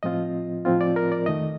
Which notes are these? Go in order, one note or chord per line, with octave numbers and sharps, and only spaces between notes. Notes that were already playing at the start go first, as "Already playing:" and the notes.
A2 F3 C4 F4 D#5
A2 F3 C4 F4
D5
A#4
D5
F2 D#3 A3 D#5